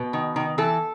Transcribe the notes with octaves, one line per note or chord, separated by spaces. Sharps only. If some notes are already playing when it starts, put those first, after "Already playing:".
Already playing: B2 B4
D#3
D#3
E3 A4